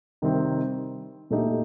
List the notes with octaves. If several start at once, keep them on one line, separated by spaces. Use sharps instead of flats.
C3 D#3 G3 C4 D#4
A#2 A3 D#4 G4